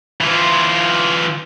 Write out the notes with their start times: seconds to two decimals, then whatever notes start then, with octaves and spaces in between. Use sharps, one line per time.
0.21 E3 F4